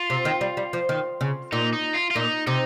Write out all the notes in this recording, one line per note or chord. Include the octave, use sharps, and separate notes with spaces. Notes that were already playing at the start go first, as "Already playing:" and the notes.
Already playing: F4
C3
D#3
G3
G3
F3
D#3
C#3
A#2 D#4
D#4
F4
F4
A#2 D#4
C3 D#4